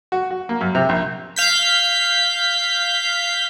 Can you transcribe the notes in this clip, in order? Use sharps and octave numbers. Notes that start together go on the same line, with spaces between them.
F#4
F#4
A#3
F#2
C3
A#1
F5 G6 B6